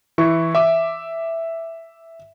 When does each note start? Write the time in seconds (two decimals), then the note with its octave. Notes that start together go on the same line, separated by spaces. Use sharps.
0.18 E3 E4 C#6
0.55 E5 D6